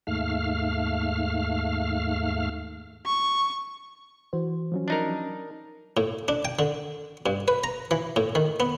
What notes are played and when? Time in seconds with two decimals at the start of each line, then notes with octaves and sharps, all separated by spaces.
0.07 D#2 G#2 A3 F5 F6
3.06 C#6
4.33 E3 F#4 C5
4.72 F3 F#3 C#4
4.88 D4 D#4 A#4
5.97 A2
6.28 D4
6.45 G5
6.59 D3
7.26 G2
7.48 B4
7.64 A#5
7.91 E3
8.16 A2
8.35 D#3
8.60 B3